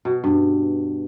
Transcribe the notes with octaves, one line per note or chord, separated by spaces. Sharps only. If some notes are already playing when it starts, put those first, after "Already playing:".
B2
G2